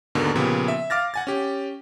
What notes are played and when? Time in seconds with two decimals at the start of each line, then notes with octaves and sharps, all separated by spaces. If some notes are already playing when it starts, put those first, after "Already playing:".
0.15 D#2 G#2 B2 D3 A#3
0.36 A#2 C#3 F3 B3 G4
0.68 E5
0.90 F5 D6 F6 A6 A#6
1.14 F#5 G#5 A6
1.27 C#4 G4